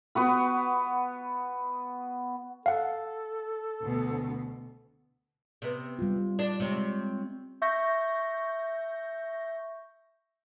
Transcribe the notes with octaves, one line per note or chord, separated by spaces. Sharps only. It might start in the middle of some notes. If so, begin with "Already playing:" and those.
B3 F#4 B4
A4 F5 F#5
D2 B2
C3 B3
G3 F4
D4
C3 G#3 C#5
E5 C#6 G6 A#6